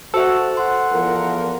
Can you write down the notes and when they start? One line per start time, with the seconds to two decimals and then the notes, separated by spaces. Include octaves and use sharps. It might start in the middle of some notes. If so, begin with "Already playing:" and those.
0.14 F#4 A4 C5 E5
0.57 F#5 C6
0.91 E2 F3 A#4